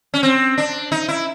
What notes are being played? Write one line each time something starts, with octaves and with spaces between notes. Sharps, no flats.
C#4
C4
D4
D#4
E4